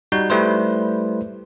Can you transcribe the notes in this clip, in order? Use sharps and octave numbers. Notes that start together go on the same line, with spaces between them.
G3 D#4 F#4 G6
G3 A3 E4 B4 C5